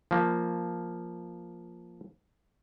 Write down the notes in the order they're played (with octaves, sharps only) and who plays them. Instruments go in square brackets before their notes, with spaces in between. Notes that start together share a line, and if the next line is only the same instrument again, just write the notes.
[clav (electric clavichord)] F3 A#3